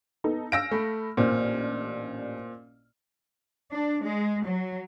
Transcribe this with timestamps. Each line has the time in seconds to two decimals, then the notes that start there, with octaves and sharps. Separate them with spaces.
0.24 B3 D#4 A4
0.52 F5 G#5 E6 F6 A#6 D7
0.71 A3 B5
1.17 A1 A#2 C4 D4 F6
3.70 D4
4.03 G#3
4.44 F#3